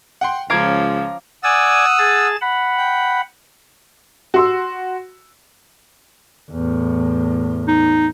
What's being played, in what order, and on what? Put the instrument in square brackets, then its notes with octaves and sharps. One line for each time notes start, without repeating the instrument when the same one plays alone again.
[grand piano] F#5 G5 C6
[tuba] C#2 [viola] F3 C#4 [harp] F5 D6 G#6 [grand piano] A#5
[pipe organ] D5 G#5 A6 [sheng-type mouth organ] F#5 D#6 E6
[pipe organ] G#4 A5 A6
F#5 B5
[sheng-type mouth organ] G5
[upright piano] F#4 C6 E6
[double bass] E2 A2
[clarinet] D#4